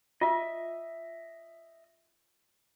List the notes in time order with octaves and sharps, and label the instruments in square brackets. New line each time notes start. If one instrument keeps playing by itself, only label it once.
[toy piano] F4 [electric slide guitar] D#5 E5